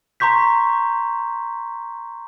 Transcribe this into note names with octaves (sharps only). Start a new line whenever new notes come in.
A#5 C6 C#6 G6 B6